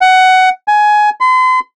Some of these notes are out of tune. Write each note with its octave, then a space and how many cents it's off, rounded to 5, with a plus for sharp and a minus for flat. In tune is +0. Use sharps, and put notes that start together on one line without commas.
F#5 +15
G#5 +15
C6 -40